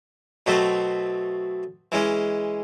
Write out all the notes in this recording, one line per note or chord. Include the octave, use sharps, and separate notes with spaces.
B2 F#3 A3 C4
E3 G#3 C#4